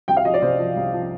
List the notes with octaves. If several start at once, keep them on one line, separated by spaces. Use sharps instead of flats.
C2 G5
F5
F3 D#5
D5
C3 C5
F3
C2
F3